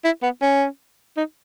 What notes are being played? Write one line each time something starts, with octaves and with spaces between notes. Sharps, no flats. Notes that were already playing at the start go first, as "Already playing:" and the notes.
E4
B3
C#4
D#4